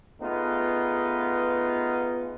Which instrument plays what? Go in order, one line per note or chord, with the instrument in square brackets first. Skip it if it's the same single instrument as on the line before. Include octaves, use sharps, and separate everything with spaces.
[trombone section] A3 B3 D#4 F4 G#4 B4